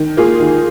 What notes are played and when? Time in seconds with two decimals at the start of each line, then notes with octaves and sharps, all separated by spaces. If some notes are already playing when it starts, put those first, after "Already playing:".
Already playing: D#3
0.17 A#3 F4 G#4
0.40 D#3